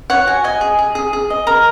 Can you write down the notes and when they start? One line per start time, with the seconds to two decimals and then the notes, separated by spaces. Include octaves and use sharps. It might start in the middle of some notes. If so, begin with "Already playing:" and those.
0.10 C#5 F#5
0.27 F#4 G#5
0.44 D#5 G#5
0.61 G#4
0.79 G#4
0.95 G#4
1.13 G#4
1.30 D#5
1.47 A#4 A#5